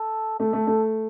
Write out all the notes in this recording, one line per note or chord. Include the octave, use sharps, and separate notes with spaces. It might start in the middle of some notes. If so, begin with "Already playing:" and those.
Already playing: A4
A3 A4
A3
A3